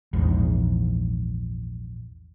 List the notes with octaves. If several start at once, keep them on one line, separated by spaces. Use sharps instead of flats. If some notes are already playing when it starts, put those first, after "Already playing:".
A#1 E2 G#2